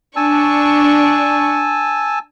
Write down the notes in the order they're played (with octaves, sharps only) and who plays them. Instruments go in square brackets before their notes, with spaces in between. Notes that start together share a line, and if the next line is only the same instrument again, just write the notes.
[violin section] D4 C#6 [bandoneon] G#5 A5 E6